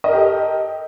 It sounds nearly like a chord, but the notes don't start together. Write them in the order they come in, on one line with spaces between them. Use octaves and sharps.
D#5 A#4 G4 A4